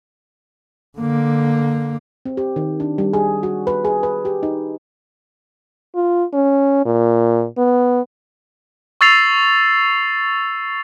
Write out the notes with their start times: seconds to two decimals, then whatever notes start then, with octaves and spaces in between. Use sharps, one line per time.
0.99 D3 A#3
2.25 C4
2.37 G4
2.56 D#3
2.80 D4
2.98 G3
3.13 G#4
3.43 F#4
3.67 B4
3.85 G#4
4.03 B4
4.25 G4
4.43 D#4
5.95 F4
6.34 C#4
6.85 A#2
7.58 B3
9.01 C#6 E6 A6 C7 F7